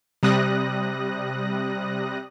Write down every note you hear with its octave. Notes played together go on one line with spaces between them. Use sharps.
C3 G3 D#6 F#6 A#6